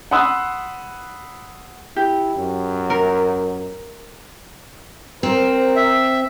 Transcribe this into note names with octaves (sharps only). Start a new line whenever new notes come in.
F#5 B5 C6 D#6 E6 F#6
E4 G4
F#2
A#4
C4 A#4 C5
E5